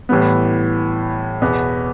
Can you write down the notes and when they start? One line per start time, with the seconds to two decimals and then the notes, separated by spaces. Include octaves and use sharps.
0.09 A2 E3 G3 B3
1.42 E2 B2 B3